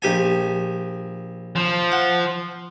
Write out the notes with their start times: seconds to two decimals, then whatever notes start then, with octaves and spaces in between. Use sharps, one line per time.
0.02 A#1 G4 G#5
1.56 F3
1.92 F#5